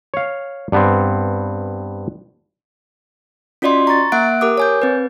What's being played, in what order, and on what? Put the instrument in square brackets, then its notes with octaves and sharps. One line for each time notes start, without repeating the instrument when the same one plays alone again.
[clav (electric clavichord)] C#5 F5
G2 B3 C4
[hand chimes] C#4 F4 F#4 D5 D#5 C6
A#5 C#6 A6
A#3 E5 F#5 F#6 D7
G4 A#4 D6 D#6
C#5 G#5 G6
C4 B4